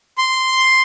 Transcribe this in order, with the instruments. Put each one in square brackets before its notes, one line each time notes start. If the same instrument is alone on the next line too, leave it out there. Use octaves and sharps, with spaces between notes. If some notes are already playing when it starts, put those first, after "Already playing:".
[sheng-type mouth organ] C6